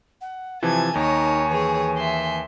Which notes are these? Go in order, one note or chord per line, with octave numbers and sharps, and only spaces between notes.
F#5
C3 E3 F3 G#5 A5 G#6
D#2 D#4 A#4 C#5
E3 G#4 C#5
E5 C6